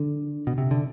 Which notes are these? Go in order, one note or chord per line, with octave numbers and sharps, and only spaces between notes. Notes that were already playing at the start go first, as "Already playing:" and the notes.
Already playing: D3
B2
C3
D3